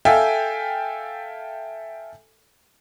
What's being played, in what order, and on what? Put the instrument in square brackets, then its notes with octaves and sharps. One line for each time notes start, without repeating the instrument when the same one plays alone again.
[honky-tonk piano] A4 E5 F5 G5 G#5